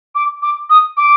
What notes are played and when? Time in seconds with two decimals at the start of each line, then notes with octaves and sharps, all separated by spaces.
0.15 D6
0.42 D6
0.70 D#6
0.97 D6